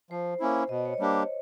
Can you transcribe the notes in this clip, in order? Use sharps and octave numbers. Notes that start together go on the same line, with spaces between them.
F3 C5
A#3 C#4 E4
B2 D#5
D5
C#5
D5
G3 A#3 D4 G4